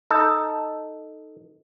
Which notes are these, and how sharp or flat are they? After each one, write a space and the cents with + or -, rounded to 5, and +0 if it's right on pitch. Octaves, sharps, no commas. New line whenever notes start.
D#4 +0 A4 +0